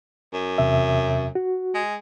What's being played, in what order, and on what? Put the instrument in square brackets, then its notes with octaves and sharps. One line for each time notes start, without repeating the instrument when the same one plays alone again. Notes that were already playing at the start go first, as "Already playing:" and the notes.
[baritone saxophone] F#2
[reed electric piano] E2 C3 E5
F#4
[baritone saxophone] G#3